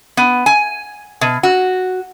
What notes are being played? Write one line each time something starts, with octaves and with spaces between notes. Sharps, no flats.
B3
G#5
B2
F#4